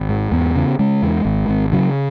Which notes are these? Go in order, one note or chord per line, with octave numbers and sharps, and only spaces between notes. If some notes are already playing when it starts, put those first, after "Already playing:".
Already playing: G#1
G#2
E2 B3
C#3
C#3 G#3
E2
G#1
G#1
C#3 F#3